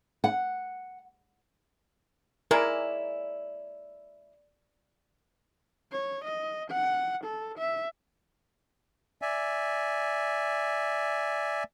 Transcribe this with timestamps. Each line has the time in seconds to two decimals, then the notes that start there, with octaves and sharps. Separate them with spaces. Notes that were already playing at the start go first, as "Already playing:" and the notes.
0.24 F#5
2.51 G#3 A#3 E4 A#4 C#5 D5 G#5
5.92 C#5
6.24 D#5
6.71 F#5
7.24 A4
7.58 E5
9.22 D5 E5 G#5